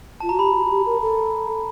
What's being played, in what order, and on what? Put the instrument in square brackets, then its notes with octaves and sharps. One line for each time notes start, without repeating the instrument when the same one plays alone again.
[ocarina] F4 [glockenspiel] A5
[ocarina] F#4 [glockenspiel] A#5
[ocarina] G4 [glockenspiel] B5
[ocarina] F#4
F#4
G4
A#4
A4